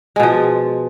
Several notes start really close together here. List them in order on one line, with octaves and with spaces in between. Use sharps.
G#3 B2 F3